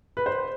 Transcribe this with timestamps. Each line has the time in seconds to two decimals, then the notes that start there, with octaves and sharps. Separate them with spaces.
0.17 B4
0.26 C5